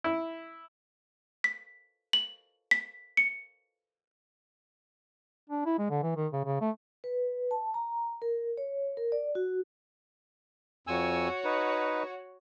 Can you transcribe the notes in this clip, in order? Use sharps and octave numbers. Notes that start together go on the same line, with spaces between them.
E4
B6
F#7
B6
C#7
D4
E4
G#3
D3
E3
D#3
C#3
C#3
A3
B4
A5
A#5
A#4
C#5
A#4
D5
F#4
F2 F#4 C#5 G#5 E6
D#4 B4